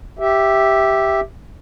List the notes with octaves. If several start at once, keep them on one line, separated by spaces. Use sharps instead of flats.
G4 E5